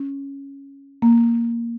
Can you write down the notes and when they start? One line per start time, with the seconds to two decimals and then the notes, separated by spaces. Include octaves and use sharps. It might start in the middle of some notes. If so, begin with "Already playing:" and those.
Already playing: C#4
1.02 A#3